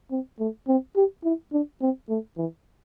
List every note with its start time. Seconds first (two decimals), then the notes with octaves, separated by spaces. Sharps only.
0.11 C4
0.40 A3
0.68 C4
0.96 G4
1.24 E4
1.52 D4
1.81 C4
2.09 A3
2.37 E3